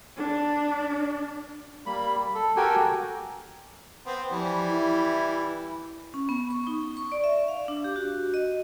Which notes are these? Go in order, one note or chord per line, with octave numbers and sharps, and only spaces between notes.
D4
G3 A#3 B5
A4
F#4 G4 A4 A#4 G5 G#5
B3 C4
E3 F3 G3
E4
C#4
B3
C#6
D#4
C#6
D5
E5
F5
D4
G4
F#4
D#5